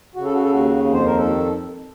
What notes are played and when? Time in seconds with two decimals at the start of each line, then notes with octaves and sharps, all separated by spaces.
0.15 C#3 F#4
0.24 A4
0.33 F#4
0.42 A4
0.50 D#2 F#4
0.84 F2
0.93 C5
1.06 A#4
1.18 D#3 A4